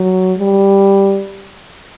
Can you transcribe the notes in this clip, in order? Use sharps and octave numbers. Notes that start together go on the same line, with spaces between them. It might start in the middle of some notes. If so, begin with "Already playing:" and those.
Already playing: F#3
G3